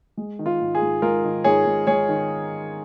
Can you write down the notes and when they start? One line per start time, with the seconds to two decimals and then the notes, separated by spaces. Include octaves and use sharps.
0.17 G#3
0.39 D#3
0.46 F4
0.60 G#2
0.75 G#4
0.82 G#2
1.02 G#3 F4 A#4
1.24 D#3
1.44 G#2 G#4 C#5
1.66 G#2
1.87 G#3 G#4 C#5
2.09 D#3